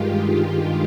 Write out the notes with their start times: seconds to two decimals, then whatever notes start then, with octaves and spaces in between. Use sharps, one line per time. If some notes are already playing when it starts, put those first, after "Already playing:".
Already playing: G2 D#3 G#3 F4 G4